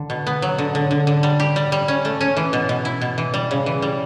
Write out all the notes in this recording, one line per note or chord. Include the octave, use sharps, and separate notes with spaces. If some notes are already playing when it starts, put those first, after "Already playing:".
Already playing: D3
B2
B3
F#3
D3
D3
D3
D3
G3
G4
G3
G3
C#4
A3
C#4
E3
B2
B2
E4
B2
E3
G3
C#3
E3
G3